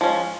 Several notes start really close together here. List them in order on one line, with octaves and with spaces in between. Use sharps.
F3 C#4 G#3